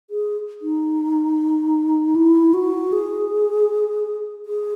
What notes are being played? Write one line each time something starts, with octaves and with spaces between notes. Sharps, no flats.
G#4
D#4
E4
F#4
G#4
G#4